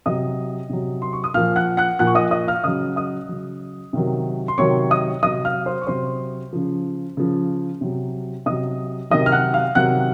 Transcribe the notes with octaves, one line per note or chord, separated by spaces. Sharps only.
C3 F#3 D#5 D#6
C3 F#3
C6
C#6
D#6
A#2 F3 F5 F6
F#5 F#6
F#5 F#6
A#2 F3 F#5 F#6
C#6
D#5 D#6
D#5 D#6
F5 F6
C#3 F#3 D#5 D#6
D#5 D#6
C#3 F#3
C3 D#3 F#3
C6
C3 D#3 F#3 C#5 C#6
D#5 D#6
C3 F#3 D#5 D#6
F5 F6
C5 C6
C#6
C3 F#3 C5 C6
C#3 F3
C#3 F3
C3 F#3
C3 F#3 D#5 D#6
C3 D#3 F#3 D#5 D#6
F6
F#5 F#6
F5 F6
C3 D#3 F#3 F#5 F#6